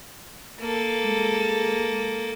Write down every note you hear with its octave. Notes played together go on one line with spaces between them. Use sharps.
A#3 A4
G#3